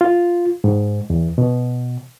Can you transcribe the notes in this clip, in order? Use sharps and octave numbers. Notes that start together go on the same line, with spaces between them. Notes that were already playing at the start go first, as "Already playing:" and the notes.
F4
G#2
E2
B2